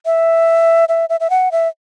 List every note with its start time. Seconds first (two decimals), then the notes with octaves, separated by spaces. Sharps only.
0.06 E5
0.89 E5
1.10 E5
1.20 E5
1.30 F#5
1.52 E5